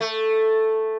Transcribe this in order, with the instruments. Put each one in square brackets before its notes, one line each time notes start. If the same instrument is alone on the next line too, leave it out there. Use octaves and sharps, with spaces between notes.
[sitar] A3